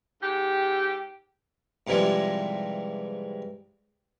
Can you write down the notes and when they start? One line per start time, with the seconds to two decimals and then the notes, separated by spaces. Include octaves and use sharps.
0.22 G#2 G4
1.87 G#2 C3 E3 F3 G3 G#3